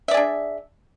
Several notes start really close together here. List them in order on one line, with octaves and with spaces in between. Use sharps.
E5 D5 G#4 D4